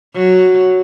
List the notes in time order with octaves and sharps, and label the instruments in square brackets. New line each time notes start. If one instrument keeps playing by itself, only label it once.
[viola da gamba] F#3